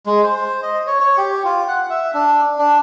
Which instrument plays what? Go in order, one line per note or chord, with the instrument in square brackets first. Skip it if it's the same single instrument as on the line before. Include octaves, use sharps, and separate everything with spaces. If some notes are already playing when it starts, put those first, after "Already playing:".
[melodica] G#3
C5
D#5
C#5
C#5
G4
F4
F#5
E5
D4
D4